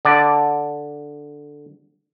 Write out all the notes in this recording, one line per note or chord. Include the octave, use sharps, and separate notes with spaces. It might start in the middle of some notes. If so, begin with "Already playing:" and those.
D3 D5